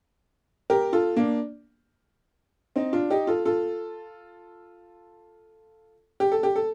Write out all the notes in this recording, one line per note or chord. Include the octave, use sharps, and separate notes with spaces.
G4 A#4
F4 A4
A#3 D4
C4 D#4
D4 F4
D#4 G4
F4 A4
F4 A4
G4
A4
G4
A4